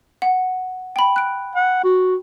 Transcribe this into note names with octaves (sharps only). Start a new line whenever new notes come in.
F#5
G5 B5
F#6 D7
F#5
F#4